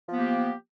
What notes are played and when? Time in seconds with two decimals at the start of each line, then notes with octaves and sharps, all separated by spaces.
0.09 F3
0.12 B3
0.15 A#3
0.18 G4